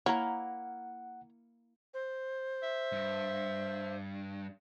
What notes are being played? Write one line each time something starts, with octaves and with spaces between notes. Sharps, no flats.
A#3 E4 A#4 C#5 F#5 A#5
C5
E5
G2